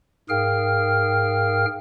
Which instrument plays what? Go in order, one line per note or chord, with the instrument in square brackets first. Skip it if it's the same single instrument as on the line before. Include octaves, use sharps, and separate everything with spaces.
[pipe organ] G#2 G#4 A#4 F5 G5 F6